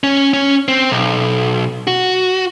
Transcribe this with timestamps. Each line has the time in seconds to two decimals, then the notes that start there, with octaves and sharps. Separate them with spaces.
0.04 C#4
0.33 C#4
0.68 C4
0.90 B1
1.87 F#4